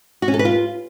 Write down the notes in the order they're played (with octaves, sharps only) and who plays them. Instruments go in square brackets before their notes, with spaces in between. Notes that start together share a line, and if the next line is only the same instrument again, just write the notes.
[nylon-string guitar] F#4
C#4
A4
B4
F4